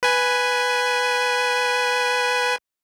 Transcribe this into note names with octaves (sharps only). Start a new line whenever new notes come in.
B4 G#5